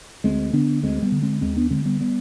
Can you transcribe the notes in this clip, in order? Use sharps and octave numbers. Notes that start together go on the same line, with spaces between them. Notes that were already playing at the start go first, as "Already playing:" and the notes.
D2 G#3 C4
D3 B3 D4
D2 G#3 C4
G3 B3
D3
G#3 C4
D#2 G#3 C4
B3 D4
D3 G#3 C4
G3 B3
G3 B3